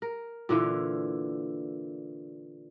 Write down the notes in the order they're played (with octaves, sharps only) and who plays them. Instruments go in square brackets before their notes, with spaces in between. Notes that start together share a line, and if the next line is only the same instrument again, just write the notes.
[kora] A#4
A#2 D3 E3 F5